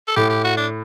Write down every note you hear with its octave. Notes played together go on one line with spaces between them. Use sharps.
A4
A2 G4
G4
F#4
D4